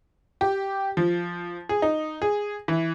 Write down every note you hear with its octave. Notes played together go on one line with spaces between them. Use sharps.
G4
F3
G#4
D#4
G#4
E3